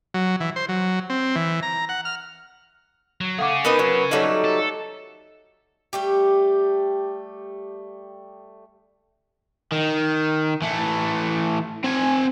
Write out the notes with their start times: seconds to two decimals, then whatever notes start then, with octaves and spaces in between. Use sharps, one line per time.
0.14 F#3
0.40 E3
0.56 C5
0.69 F#3
1.10 C4
1.36 E3
1.63 A#5
1.89 F#5
2.05 F6
3.21 F#3
3.39 A3 C#4 G#4 F5 F#5 D6
3.65 B3 D#4 A#4 B4 D#5
3.79 F#3
4.11 F#3 G3 A3 D#4 C#5 F#7
4.44 A4
5.93 G3 A3 G4
9.72 D#3
10.62 E3 A3
11.84 C4 G#5